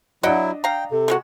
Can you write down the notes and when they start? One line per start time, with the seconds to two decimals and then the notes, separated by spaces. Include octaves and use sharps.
0.23 F#3 D4 E4 F#4 D#5 F#5 G5
0.64 F5 G5 A#5
0.91 C3 A4
1.08 E3 G#3 F#4